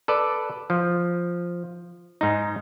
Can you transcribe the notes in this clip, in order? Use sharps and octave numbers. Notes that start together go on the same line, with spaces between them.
A4 B4 D5
F3
G#2 D#4